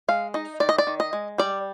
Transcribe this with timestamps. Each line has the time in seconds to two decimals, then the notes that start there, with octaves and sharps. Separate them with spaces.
0.08 G#3 F5
0.34 D#4 D#5
0.60 D#3 D5
0.69 D#5
0.78 D5
0.87 D#3
1.00 D#5
1.13 G#3
1.38 G3 D5